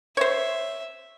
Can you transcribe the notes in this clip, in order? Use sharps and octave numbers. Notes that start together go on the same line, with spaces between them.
C5 C#5 E5